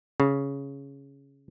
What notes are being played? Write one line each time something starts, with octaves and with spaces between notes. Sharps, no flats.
C#3